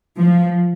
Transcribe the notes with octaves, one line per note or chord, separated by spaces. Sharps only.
F3